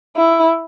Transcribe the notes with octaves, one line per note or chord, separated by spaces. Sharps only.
E4